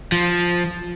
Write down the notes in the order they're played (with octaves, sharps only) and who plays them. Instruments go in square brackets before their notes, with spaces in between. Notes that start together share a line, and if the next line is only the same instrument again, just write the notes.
[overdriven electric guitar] F3